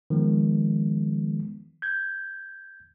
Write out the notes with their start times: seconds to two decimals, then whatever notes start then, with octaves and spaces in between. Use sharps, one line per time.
0.10 D#3 F3 G#3 B3
1.82 G6 G#6